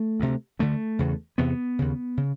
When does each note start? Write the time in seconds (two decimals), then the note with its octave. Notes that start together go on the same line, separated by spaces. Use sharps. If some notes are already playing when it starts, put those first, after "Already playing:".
Already playing: A3
0.20 D2 C3
0.59 D2 D3 A3
0.99 E2 C#3
1.38 E2 C3 B3
1.79 D#2 C#3
2.17 C#3